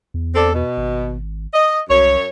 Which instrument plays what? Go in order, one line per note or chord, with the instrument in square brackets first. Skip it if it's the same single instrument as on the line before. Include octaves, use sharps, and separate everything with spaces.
[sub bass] E2
[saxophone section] C4 D4 A4
B2
[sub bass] G#1
[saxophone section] D#5
[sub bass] C2 [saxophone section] F#2 C#5